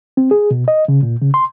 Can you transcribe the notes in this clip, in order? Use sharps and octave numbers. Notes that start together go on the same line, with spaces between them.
C4
G#4
B2
D#5
C#3
A#2
C#3
C6